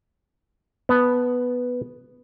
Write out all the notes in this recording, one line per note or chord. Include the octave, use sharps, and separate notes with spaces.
B3 A5